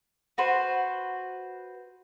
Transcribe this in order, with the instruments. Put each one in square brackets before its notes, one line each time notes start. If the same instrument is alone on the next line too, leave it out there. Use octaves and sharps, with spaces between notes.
[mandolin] F#4 B4 C5